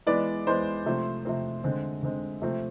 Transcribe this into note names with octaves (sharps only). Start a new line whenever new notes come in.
E3 G#3 B3 D5
E3 G#3 B3 C5
C3 F3 A3 C4
C3 F3 A3 C4
D3 G#3 C4
D3 G#3 C4
C3 F3 A3 C4